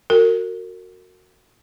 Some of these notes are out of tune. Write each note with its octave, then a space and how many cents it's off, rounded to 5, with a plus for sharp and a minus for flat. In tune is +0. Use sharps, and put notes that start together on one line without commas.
F#4 -10 A#4 -35